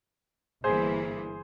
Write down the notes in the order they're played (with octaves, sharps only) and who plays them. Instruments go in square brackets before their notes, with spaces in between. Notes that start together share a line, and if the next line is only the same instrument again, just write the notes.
[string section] G1 G2 E3 A#3 [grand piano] G#4 C5